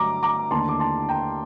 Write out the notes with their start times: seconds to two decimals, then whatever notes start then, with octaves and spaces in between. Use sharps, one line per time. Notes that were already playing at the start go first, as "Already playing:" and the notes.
Already playing: G2 D3 F#3 A3 A#5 D6
0.23 A#5 D6
0.51 D#2 D3 A3 A5 C6
0.69 D6
0.80 A5 C6
1.09 G5 A#5